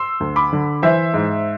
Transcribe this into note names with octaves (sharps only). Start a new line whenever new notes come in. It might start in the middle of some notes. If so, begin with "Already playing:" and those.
Already playing: C6 E6
D2
B5 D6
D3
E3 C5 E5
G#2